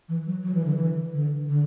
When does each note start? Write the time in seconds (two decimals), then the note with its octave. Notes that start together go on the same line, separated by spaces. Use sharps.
0.09 E3
0.27 F#3
0.43 F#3
0.55 E3
0.65 D3
0.76 E3
1.14 D3
1.49 D3